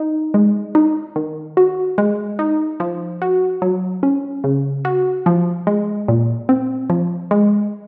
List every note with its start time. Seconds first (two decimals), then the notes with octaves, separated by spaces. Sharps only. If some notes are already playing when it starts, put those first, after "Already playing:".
Already playing: D#4
0.34 G#3
0.75 D#4
1.16 D#3
1.57 F#4
1.98 G#3
2.39 D#4
2.80 F3
3.22 F#4
3.62 F#3
4.03 C#4
4.44 C#3
4.85 F#4
5.26 F3
5.67 G#3
6.08 A#2
6.49 C4
6.90 F3
7.31 G#3